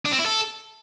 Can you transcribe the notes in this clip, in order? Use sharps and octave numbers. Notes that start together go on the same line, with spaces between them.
D4
C4
E4
A4